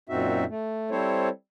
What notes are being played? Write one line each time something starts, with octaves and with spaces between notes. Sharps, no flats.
F#2 A#2 C4 D#4 F#4 E5
A3
G3 C4 E4 A4 C5 C#5